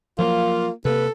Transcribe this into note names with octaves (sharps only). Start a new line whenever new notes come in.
F3 F#3 A#3 F4
C3 A#3 A4 B4